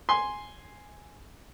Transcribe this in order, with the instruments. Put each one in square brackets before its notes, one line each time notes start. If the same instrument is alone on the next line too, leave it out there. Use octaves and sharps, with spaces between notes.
[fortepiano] G#5 C6